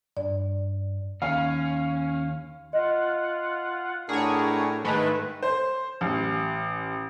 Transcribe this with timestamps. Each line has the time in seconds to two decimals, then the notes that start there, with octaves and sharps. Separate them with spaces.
0.17 G2 D5
1.22 D#2 C#4 F5
2.73 F4 D#5 F#5
4.09 A2 D4 F#4 G#4 A#4 C#5
4.84 G#2 D#3 G#3 A3 B4
5.43 C5
6.01 A1